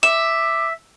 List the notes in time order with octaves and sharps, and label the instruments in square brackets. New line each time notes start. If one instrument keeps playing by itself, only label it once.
[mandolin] E5 [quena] D6 [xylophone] E7